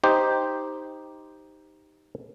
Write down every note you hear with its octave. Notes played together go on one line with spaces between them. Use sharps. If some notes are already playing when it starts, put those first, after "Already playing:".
D#4 G4 C5